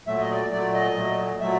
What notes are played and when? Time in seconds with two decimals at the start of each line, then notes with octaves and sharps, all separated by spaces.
0.07 A#2 F#3 A3 E5
0.20 D#5
0.30 D5
0.52 A#2 F#3 A3 D5
0.74 D#5
0.96 A#2 F#3 A3
1.40 A#2 F#3 A3 E5